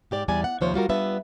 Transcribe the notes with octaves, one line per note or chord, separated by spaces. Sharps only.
G#2 G4 D5
E2 G3 D5 G#5
F#5
D#2 C3 F3 C5 C#5
G3 F4 F#4 A#4
G3 B3 D4 F4 B4 E5